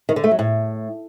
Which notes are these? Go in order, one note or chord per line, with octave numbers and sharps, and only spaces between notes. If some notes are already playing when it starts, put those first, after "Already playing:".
D#3
D3
A3
F#3
A2